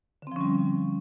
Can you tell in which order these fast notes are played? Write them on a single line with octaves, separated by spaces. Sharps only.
D3 C4 F3 C#4 G3